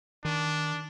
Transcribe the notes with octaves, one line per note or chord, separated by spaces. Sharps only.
D#3 D4